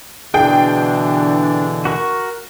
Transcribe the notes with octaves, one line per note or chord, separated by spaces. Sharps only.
B2 D3 E3 D4 G#4 G5
F#4 A#4 C#6